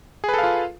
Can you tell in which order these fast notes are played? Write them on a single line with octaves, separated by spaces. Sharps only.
G#4 B4 A4 F5 F4